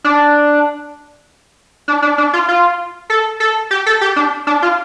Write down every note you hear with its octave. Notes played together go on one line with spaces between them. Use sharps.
D4
D4
D4
D4
F4
F4
A4
A4
G4
A4
G4
D4
D4
F4